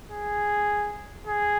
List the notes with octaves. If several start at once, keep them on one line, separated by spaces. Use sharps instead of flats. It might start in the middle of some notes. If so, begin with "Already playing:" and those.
G#4
G#4